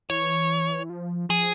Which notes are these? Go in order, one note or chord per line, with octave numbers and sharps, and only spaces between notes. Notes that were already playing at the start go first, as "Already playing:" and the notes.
E3 C#5
F3
F3 G#4